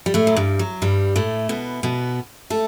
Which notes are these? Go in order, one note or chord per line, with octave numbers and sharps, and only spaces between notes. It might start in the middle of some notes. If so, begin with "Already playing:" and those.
G3
A2 A3
F#3
G2 G3
F#3
G2 G3
A2 A3
B2 B3
B2 B3
A3 A4